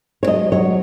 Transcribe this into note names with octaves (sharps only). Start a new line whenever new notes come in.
C#5
F#3 D#5
F#3 C#5